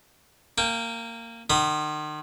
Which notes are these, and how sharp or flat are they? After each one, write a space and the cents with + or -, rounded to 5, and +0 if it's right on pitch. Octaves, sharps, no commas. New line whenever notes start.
A#3 -20 G5 +0
D#3 -40 B5 +0 D#6 +0